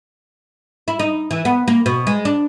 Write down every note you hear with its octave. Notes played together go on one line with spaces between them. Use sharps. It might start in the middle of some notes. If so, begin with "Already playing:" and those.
E4
D#4
E3
B3
A#3
B2
G#3
D4